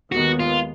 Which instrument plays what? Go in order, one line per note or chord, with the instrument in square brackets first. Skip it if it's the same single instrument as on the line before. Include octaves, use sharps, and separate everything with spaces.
[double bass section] D#2 D#3 G#3 B3 [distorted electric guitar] F#4
[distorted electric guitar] F4